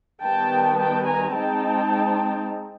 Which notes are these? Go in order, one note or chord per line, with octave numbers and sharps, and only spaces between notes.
D#3 G3 B3 G5 A5
G5 A5
G#5 A#5
G#3 C4 D#4 G5 A5